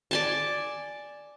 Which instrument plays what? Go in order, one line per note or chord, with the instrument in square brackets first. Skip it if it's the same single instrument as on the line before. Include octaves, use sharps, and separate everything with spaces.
[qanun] D5 G#5 A5